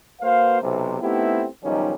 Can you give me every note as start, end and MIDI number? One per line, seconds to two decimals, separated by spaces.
0.21 0.62 58
0.21 0.62 66
0.21 0.62 71
0.21 0.62 72
0.21 0.62 77
0.62 0.97 35
0.62 0.97 48
1.01 1.47 57
1.01 1.47 59
1.01 1.47 60
1.01 1.47 63
1.01 1.47 64
1.01 1.47 67
1.64 1.95 35
1.64 1.95 51
1.64 1.95 53
1.64 1.95 55
1.64 1.95 61
1.64 1.95 63